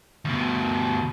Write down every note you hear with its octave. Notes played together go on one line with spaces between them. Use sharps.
D2 B2